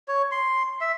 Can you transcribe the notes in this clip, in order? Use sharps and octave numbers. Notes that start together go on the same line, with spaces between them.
C#5
C6
E5